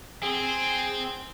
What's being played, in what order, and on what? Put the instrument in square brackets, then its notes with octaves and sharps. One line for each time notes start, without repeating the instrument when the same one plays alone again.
[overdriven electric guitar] C4 [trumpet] G#4